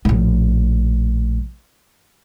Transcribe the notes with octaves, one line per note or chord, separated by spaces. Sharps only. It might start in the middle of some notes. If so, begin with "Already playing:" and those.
A#1 A2